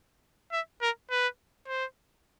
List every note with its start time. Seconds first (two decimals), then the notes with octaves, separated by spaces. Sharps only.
0.52 E5
0.82 A#4
1.11 B4
1.68 C5